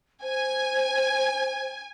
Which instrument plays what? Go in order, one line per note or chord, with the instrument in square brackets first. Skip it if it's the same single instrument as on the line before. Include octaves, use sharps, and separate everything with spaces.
[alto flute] C5 [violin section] G#5